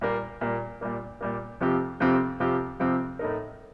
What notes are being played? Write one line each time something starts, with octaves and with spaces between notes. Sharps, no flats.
A#2 G3 A#3
A#2 G3 A#3
A#2 G3 A#3
A#2 G3 A#3
F2 C3 F3 C4 G4
F2 C3 F3 C4 G4
F2 C3 F3 C4 G4
F2 C3 F3 C4 G4
A2 A3 D#4 A#4